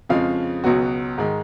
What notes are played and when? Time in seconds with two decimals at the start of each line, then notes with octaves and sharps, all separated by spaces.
0.09 F2 C#3 F3 G#3 F5
0.64 C#2 B2 F#3 B3 F#4
1.18 G#2 D#3 G#3